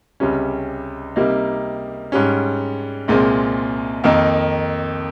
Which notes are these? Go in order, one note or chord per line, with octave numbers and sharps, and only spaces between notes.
C#2 C3 G3 C#4
C3 G3 A#3 D#4
G#2 G3 C#4
C2 A#2 G#3 C4
F2 D#3 A#3 D#4